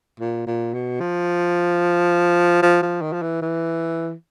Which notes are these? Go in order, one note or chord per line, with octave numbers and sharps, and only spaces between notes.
A#2
A#2
B2
F3
F3
F3
D#3
F3
E3
E3